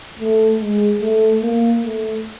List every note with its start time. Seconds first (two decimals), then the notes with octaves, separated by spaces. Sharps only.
0.19 A3
0.60 G#3
1.01 A3
1.42 A#3
1.84 A3